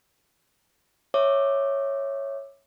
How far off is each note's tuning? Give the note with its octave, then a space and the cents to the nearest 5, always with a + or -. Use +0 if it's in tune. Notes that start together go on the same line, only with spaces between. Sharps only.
C#5 -10 E5 +0 D6 +15